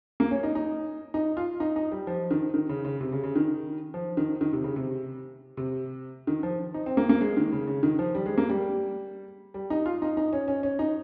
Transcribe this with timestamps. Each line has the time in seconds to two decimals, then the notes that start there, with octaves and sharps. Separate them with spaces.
0.20 A#3
0.31 C#4
0.43 D#4
0.55 D#4
1.14 D#4
1.37 F4
1.60 D#4
1.76 D#4
1.92 G3
2.07 F3
2.31 D#3
2.54 D#3
2.69 C#3
2.85 C#3
3.01 C3
3.12 C#3
3.23 C#3
3.36 D#3
3.94 F3
4.17 D#3
4.41 D#3
4.53 C3
4.64 C#3
4.76 C3
5.57 C3
6.27 D#3
6.43 F3
6.74 D#4
6.86 C4
6.97 A#3
7.09 A#3
7.21 G#3
7.37 D#3
7.52 C#3
7.67 C#3
7.83 D#3
7.99 F3
8.15 G3
8.26 G#3
8.38 A#3
8.50 G3
9.54 G3
9.70 D#4
9.86 F4
10.02 D#4
10.17 D#4
10.33 C#4
10.48 C#4
10.63 C#4
10.79 D#4